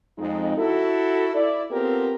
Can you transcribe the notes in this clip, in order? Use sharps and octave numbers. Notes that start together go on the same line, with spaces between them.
F2 G#3 D#4
E4 F#4 A4
E4 D5
B3 C4 F4 G4 A4 A#4